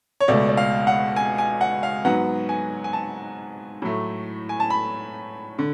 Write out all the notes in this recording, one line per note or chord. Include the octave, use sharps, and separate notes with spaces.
C#5
C#2 B2 A3 D5
D5
F5
F#5
G#5
G#5
F#5
F5
G#2 F#3 B3 F#5
G#5
G#5
A5
A2 F#3 A3
G#5
A5
B5
D3